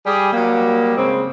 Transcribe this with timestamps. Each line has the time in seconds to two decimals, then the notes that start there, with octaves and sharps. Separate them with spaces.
0.06 G3 G#4
0.33 F#3 G3 A#3
0.96 G#2 C#3 G#3 C4